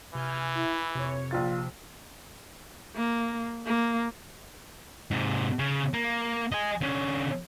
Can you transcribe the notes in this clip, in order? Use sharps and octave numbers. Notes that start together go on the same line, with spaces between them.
C3 E3 G#5 F6 G6
E4
F2 C3 C#5
A#1 F3 F4 A6
A#3
A#3
G#2 C3
C#3
A#3
D#5 G#5
D3 C#4